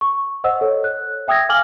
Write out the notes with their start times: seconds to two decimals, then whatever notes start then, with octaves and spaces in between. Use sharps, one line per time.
0.01 C#6
0.44 C5 D#5 F#5 E6
0.61 A4 C#5
0.84 F#6
1.28 E5 G5 D#6 E6 G#6 A#6
1.49 F5 G#5 D6 F6 F#7 G7